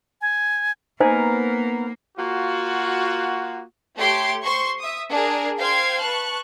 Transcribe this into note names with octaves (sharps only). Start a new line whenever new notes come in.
G#5
A#3 B3 D#4 A#4 C5 G#5
A#3 F4 F#4
A3 G4 C#5 C6 D7
C5 C6 C#6
E5 D#6
D4 G#4 A#4
C5 F5 G5 C6 G#6
B4 A5 C#6 F#6